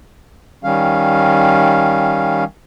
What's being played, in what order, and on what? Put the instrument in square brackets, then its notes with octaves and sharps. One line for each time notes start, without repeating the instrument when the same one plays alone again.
[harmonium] D#3 G3 C#4 F5